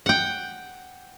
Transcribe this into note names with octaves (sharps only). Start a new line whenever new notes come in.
F#5 G5